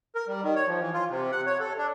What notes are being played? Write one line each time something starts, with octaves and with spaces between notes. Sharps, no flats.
A#4
G3
D#3
C#5
F3
E3
F4
C3
F#5
C#5
A4
D4